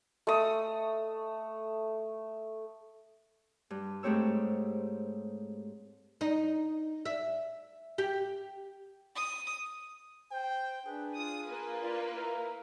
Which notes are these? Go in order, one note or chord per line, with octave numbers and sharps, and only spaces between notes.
A3 D#6
G2
G#2 A3 C4 G4 C#5 E6
D#4
E5
G4
D#6
C5 G5
D4 G#4 B4
F4 D#6
A#3 B4
F4 D5
E4 A#4 F5